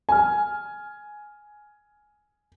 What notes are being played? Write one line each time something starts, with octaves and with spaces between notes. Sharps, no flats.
G#5 F6